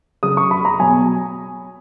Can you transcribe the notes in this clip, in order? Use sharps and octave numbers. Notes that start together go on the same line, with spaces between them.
C#3 F#3 D#6
C#6
B5
A#5
B2 F#3 G#5